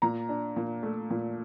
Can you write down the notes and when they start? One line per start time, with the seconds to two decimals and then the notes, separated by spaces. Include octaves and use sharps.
0.02 A#2 A#5
0.29 D4
0.56 A#2
0.83 A3
1.10 A#2